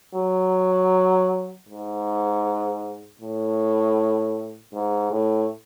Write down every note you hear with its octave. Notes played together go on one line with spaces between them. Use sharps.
F#3
G#2
A2
G#2
A2